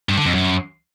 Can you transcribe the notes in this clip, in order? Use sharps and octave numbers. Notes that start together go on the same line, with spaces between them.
G2
D3
F2
F#2